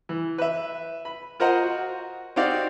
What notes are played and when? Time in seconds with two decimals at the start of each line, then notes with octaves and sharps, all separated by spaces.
0.09 E3
0.38 B4 E5
1.05 B5
1.40 F4 A#4 C5 D#5 F#5 A#5
1.63 F#4
2.36 C4 D#4 F#4 G4 D5 F5